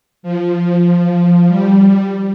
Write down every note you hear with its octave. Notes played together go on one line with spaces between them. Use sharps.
F3
G3